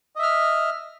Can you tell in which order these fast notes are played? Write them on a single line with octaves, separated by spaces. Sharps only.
D#5 E5 F6